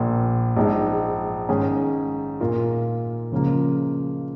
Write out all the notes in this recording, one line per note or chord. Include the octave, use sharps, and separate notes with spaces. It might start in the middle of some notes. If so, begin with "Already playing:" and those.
Already playing: A#1 A#2 A#3
A#1 G#2 G#3
G#2 D#3 C#4 G#4
A#2 A#3 F4 A#4
C#2 C#3 F3 A#3